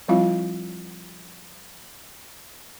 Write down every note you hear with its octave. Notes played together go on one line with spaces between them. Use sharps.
F3 G3 C4 E4 F4 F5